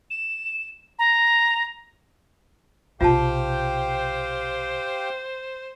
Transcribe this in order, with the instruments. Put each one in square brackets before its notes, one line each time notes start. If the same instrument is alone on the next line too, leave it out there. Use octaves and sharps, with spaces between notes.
[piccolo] E7
A#5
[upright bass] B1 C3 [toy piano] F4 A5 [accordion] G4 F5 G5 [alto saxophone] C5